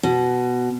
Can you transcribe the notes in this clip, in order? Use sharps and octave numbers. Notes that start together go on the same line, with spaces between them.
B2